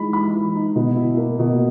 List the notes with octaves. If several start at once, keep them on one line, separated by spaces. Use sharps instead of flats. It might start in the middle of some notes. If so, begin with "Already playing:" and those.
Already playing: E3 G#3 D#4 B5
E3 B5
E3
D#4
B2
E4
A#3
B2